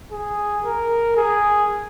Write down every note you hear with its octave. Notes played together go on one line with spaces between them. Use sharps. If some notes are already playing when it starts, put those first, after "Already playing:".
G#4
A#4
G#4